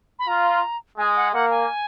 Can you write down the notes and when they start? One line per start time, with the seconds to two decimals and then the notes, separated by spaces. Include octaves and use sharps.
0.19 B5
0.28 F4 A#5
0.98 G#3 G#5
1.16 F#5
1.33 A#3 F#5
1.50 G#5